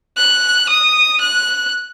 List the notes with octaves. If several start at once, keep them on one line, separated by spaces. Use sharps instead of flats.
F#6
D#6
F#6